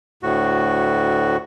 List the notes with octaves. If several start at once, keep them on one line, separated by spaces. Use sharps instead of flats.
D2 A2 F#4